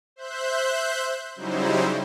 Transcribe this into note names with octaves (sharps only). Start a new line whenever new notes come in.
C5 E5 F#6 G6
C#3 F#3 G3 D#4 E4 C5